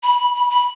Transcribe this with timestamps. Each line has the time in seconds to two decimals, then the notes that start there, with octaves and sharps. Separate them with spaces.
0.03 B5
0.19 B5
0.35 B5
0.50 B5